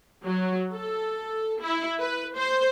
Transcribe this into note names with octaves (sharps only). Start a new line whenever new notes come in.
F#3
A4
E4
B4
C5